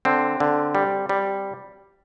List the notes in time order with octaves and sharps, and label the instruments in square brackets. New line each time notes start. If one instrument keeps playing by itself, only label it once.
[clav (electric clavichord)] D3 C4
D3
G3
G3